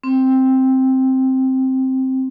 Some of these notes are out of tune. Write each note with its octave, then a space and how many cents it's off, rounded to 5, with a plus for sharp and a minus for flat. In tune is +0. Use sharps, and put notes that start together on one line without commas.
C4 +5